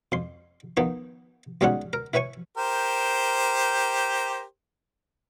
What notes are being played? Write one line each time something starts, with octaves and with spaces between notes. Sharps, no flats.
F2 C6
D#3 F3 B3 D#4
B1 G3 G#3 C#4 D#4 F#5
A#4
E4 B4 C#5 G#5 C#6
G4 A#4 C5